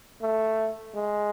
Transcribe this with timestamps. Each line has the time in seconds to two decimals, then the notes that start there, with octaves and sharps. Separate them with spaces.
0.22 A3
0.95 G#3